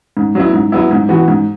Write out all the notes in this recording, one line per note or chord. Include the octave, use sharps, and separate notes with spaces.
G#2
F#3 B3 E4
G#2
F#3 B3 E4
G#2
E3 B3 F#4
G#2